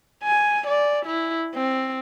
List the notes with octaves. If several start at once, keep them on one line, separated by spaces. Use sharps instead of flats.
G#5
D5
E4
C4